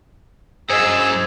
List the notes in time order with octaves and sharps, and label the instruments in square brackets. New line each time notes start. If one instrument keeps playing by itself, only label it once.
[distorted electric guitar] F#2 [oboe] G#4 [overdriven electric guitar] C5 D#5 [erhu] E6